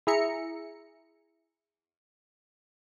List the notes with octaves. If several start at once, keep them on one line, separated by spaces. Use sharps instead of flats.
E4 G#4 E5 A#5 C#7